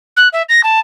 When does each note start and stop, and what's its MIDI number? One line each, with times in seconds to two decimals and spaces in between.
0.17 0.28 90
0.33 0.43 76
0.49 0.61 94
0.64 0.80 81